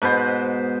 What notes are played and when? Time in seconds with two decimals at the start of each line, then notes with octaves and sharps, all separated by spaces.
0.02 G#2 B2 B4 C5